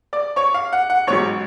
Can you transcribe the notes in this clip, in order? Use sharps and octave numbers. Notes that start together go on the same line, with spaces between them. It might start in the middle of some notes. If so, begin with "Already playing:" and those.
D5 D6
C#5 C#6
F5
F#5
F#5
A1 G#2 F#3 C#5 C#6